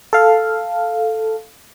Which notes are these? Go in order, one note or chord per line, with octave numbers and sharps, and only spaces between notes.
A4 F5